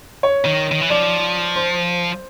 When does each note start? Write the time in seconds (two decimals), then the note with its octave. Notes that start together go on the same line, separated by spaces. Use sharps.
0.23 C#5
0.45 D#3
0.72 D#3
0.81 E3
0.90 F3 D5
1.56 C5